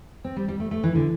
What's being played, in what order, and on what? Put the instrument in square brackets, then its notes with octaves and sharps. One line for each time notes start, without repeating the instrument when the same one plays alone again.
[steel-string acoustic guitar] C4
G3
G3
A3
A3
E3
D3